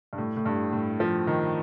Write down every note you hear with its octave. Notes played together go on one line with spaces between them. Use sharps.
G2
A2
A2
G2
A2
F3
D#3